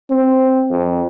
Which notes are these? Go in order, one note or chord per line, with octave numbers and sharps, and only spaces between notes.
C4
F2